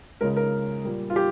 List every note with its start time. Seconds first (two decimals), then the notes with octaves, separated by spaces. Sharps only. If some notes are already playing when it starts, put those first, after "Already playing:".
0.21 C#2 C#3 G#3 A#4
0.36 A#4
0.84 A#2 G3 A#3
1.10 F4
1.16 G4